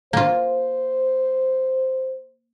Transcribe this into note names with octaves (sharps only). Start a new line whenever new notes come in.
A#3 F4 C5